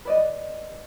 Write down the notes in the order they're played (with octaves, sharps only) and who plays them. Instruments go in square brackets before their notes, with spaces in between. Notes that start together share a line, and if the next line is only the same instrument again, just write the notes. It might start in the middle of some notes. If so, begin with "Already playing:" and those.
[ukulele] B4 D5 D#5